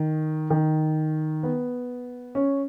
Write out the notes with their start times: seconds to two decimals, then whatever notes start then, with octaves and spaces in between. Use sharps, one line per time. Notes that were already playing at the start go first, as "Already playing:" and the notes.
Already playing: D#3
0.50 D#3
1.43 B3
2.35 C#4